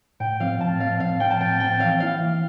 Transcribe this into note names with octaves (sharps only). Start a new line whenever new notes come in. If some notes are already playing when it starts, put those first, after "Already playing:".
A2 G5
F3 C4 F5
A2 A5
F3 C4 F5
A2 F5
F3 C4 G5
A5
A2 G5
F3 C4 G5
E3 F5
A#3 E4 F5
E3